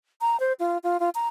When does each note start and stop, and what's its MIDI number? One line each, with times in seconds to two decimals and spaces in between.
0.21 0.39 82
0.40 0.53 72
0.60 0.78 65
0.84 1.00 65
1.00 1.10 65
1.15 1.28 82